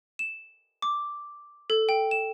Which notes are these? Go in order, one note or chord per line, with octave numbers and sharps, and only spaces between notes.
E7
D6
A4
G5
E7